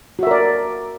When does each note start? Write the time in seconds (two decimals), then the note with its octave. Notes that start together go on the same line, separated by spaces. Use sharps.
0.19 F#4
0.23 E5
0.27 A#4
0.31 D5